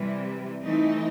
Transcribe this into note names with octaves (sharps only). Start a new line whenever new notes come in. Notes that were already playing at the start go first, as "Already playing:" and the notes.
Already playing: C3 E3 G3
E3 A3 C4 D#4